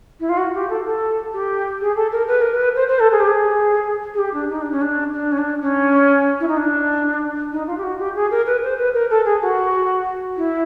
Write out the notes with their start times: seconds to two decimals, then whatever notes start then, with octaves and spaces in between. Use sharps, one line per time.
0.20 E4
0.29 F4
0.37 F#4
0.54 G4
0.69 A4
0.86 A4
1.33 G4
1.81 G#4
1.96 A4
2.12 A#4
2.28 B4
2.42 A#4
2.54 B4
2.76 C5
2.88 C5
2.99 A4
3.12 G#4
3.20 G4
3.27 G#4
4.14 G#4
4.19 G4
4.34 D4
4.50 D#4
4.61 D4
4.71 C#4
4.82 D4
5.14 D4
5.32 C#4
5.38 D4
5.61 C#4
6.40 E4
6.48 D#4
6.57 D4
7.52 D#4
7.67 F4
7.77 G4
7.83 F#4
7.99 G4
8.15 G#4
8.31 A#4
8.46 B4
8.63 C5
8.78 B4
8.94 A#4
9.10 A4
9.25 G#4
9.42 F#4
10.37 E4